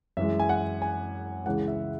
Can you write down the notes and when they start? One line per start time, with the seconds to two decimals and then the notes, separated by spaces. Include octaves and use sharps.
0.17 F#2 E3 G#3 E5
0.40 G#5
0.49 F#5
0.82 G#5
1.46 C#2 C#3 E3 G#3 F#5
1.68 E5